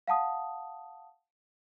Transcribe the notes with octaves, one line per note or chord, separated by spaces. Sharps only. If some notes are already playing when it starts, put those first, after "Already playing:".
F5 F#5 A5 D#6